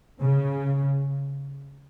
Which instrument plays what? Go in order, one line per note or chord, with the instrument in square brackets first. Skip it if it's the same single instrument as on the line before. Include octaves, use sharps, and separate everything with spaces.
[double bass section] C#3